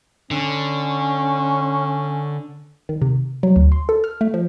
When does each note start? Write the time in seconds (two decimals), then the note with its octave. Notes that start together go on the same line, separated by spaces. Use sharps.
0.31 D3 C#4
2.89 D#3
3.02 C3
3.43 F#3
3.56 D2
3.72 C6
3.89 A4
4.04 F6
4.21 A3
4.34 F3